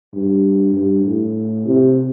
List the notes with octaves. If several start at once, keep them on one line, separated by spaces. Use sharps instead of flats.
G2
G2
A2
C3